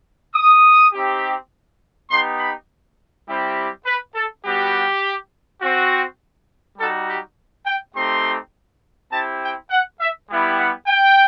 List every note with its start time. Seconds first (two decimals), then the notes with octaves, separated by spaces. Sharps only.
0.34 D#6
0.93 C4 D#4 G4
2.10 B3 D#4 G4 C6
2.39 B5
3.27 G3 C4 E4 G4
3.86 B4
4.15 A4
4.44 G3 B3 F#4 G4
5.61 C4 F#4
6.78 G3 D#4 F#4 A4
7.07 G4
7.66 G5
7.95 A3 C4 D#4 G4 C6
9.12 C4 E4 G4 A5
9.41 G5
9.70 F#5
10.00 E5
10.29 G3 B3 E4 G4
10.59 F#5
10.88 G5